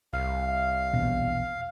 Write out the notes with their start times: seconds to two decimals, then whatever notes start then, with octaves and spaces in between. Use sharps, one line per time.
0.13 C2 F5
0.93 A#1 E2 B2